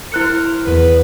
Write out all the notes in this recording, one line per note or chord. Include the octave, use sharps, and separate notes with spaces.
E4 A#4 C5 F#6 C#7
E2 B4